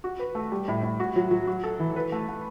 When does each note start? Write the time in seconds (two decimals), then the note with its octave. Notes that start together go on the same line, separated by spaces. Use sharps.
0.04 F#4
0.19 B4
0.35 A3
0.52 G3
0.68 A2
0.83 A2
1.00 F#4
1.16 F#3
1.31 F#3
1.47 F#4
1.64 A4
1.80 E3
1.96 B4
2.12 A3
2.28 A3